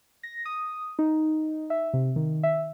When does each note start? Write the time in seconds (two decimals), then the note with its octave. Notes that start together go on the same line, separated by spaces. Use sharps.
0.23 A#6
0.45 D#6
0.99 D#4
1.70 E5
1.94 C3
2.16 D#3
2.43 E5